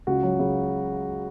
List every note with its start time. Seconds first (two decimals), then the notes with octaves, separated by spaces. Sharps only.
0.07 C#2 F#4
0.23 F#3
0.39 C#3